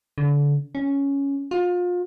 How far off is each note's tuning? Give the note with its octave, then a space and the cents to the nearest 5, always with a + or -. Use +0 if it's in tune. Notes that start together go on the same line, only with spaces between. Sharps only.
D3 -30
C#4 +5
F4 +30